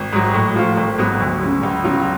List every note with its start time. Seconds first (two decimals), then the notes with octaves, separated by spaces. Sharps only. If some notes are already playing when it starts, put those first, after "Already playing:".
Already playing: G#1
0.13 G#2 F#3
0.34 A2
0.56 F3 A3 F4
0.77 G#1
0.99 G#2 F#3 B3
1.20 D2
1.41 C#3 F#3
1.63 C#2
1.84 C#3 F#3 B3 F4